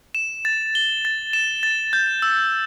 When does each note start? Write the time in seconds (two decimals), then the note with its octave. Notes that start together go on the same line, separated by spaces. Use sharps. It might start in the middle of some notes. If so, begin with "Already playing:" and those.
0.15 E7
0.45 A6
0.75 G7
1.05 A6
1.33 E7
1.63 A6
1.93 G6
2.22 E6